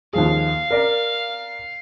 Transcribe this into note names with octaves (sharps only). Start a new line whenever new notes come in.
D#2 F3 G#4 F5
A#4 D5